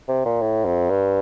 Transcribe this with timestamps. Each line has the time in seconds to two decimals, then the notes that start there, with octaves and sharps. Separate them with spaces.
0.08 C3
0.25 A#2
0.41 A2
0.65 F2
0.90 G2